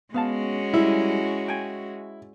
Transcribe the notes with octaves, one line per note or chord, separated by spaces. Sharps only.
G#3 B3 C#4 F#4 F5 A5
G3 E4
G5 G#5